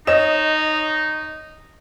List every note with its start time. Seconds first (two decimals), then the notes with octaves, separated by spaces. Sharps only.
0.07 D#4 C#5 D#5 E7